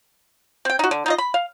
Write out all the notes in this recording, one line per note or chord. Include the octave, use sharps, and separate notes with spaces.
C4 G5
D#4 F#4
D3
D#4 F4 D#5
B5
F5